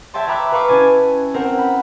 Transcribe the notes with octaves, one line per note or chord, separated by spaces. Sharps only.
C#5 E5 G5 A5 C6
E5 A#5 B5 D6 E6 F#6
B4 F5 B5 C#6 D6
C#4 E4 G#5 A5
C4 A#4 C5 F#5
B5